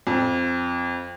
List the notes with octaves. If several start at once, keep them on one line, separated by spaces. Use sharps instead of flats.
F2